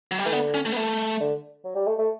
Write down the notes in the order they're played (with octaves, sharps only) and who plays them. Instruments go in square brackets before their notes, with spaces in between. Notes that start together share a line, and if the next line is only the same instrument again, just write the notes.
[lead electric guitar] F#3
G3
[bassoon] E3 [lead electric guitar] A3
[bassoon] D3 [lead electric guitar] B3
[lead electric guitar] C#4
A3
B3
A3
[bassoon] D3
F#3
G3
A3
A3